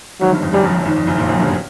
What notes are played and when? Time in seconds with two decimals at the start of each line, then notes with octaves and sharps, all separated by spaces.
0.21 G#1 G#2 F#3
0.32 G1 G2
0.43 F2
0.53 F#1 F#2 G3
0.64 F2
0.75 F#1 F#2
0.86 G#1 G#2
0.96 F2
1.07 F#1 F#2
1.18 A#1 A#2
1.29 F#1 F#2
1.39 G1 G2